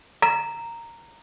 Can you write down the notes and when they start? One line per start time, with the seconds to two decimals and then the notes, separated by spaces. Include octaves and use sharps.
0.22 A#5